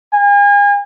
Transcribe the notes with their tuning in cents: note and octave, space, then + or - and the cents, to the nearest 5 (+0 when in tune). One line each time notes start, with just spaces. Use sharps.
G#5 -40